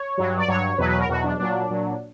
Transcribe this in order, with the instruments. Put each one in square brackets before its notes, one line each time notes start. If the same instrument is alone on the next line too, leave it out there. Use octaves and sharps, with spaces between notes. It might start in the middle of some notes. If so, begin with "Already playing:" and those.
Already playing: [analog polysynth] C#5
G2 F#3
D5
G2 F#3 C#5
E2 B2 F#3 B4
B4
A#4
E2 B2 F#3 F#4
D4
A#2 F#3 D4
A#2 F#3